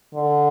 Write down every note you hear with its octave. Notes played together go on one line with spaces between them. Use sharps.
D3